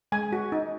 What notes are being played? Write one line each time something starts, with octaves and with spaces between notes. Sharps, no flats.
G#3 G#5
F#4
D#4